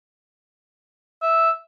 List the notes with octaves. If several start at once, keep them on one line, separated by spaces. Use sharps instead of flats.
E5